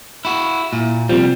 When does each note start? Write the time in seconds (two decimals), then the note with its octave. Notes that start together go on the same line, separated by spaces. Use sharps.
0.25 E4 F#4
0.73 A#2 E4
1.09 C3 F3 G3